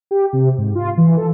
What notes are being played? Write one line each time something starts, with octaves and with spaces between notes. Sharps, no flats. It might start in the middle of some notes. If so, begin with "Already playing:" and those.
G4
C3
G#2
F4
E3
A4